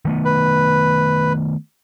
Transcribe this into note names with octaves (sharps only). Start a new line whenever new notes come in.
D#3 A3 B3
B4